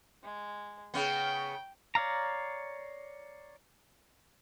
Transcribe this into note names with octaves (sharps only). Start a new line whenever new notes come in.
G#3
C#3 B3 G5
C#5 D5 F5 A#5